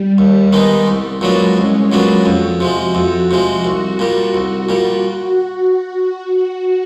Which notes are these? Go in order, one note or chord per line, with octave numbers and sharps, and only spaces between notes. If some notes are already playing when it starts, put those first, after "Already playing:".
Already playing: G3
D#2
D#3 G#3 B3 D#4
C2
A#2 F#3 G#3 B3 D4
C2 C#4
A#2 F#3 B3 D4
F2 F#4
C3 F3 G#3
F2
C3 F3 G#3
C2
A#2 G3
C2
A#2 G3